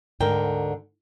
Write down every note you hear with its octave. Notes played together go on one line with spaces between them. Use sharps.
D2 G#2 D3 A#4 G5